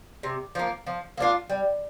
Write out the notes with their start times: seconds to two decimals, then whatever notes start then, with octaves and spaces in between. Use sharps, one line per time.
0.23 C3
0.55 F3 A#3
0.87 F3
1.18 A#3 D4 F4
1.50 G3